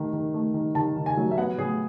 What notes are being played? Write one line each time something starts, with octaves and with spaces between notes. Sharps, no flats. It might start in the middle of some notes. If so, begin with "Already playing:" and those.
Already playing: D#3 A3
D#3
A3
D#3
D#3 A5
D#3
G#5
F#3
E5
B3 F#5
A2 G#4